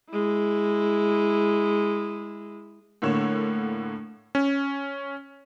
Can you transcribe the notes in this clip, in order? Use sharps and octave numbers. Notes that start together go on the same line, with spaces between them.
G#3 E4
A2 D3 A#3 C#5 E7
C#4